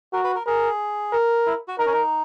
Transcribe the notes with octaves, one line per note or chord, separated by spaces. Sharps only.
F#4 A#4
B4
A#4
G#4 A#4
A#4
E4
F#4
D#4 A#4
C#4
D#4